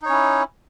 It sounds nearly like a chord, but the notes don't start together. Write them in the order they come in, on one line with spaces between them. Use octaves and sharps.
D#4 C#5 C#4 E4